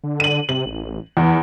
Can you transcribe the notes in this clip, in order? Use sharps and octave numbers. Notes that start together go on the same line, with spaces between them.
D3
D#7 F#7
C3 F#7
A1
E2 E3